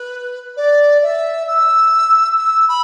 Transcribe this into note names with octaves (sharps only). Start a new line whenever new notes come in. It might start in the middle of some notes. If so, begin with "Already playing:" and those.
Already playing: B4
D5
E5
E6
E6
B5